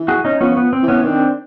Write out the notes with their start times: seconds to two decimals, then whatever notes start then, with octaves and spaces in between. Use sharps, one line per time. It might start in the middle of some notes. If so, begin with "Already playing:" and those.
Already playing: E3
0.08 F#4 G#4
0.25 C#4 D#4
0.41 F3 B3 C#4
0.57 B3
0.73 C4
0.83 E3
0.88 B3 C#4
1.04 D#3 C4 D4